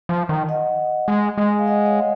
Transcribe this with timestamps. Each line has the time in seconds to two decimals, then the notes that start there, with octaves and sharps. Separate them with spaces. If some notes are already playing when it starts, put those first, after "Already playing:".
0.09 F3
0.29 D#3
0.49 D#5 F#5
1.08 G#3
1.38 G#3
1.59 F5
1.66 D#5 F#5
1.82 D#5
1.86 C#5 F5